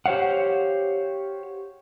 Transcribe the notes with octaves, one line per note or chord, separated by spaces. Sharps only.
G4 C5 C#5 F5 F#5